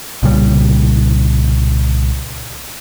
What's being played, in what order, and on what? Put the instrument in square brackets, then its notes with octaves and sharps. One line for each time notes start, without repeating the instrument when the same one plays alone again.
[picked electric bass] C2 A#2 C#3 G3